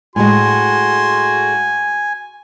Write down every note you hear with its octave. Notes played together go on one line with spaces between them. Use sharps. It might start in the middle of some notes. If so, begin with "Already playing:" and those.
A2 G#3 F#4 G#5 C6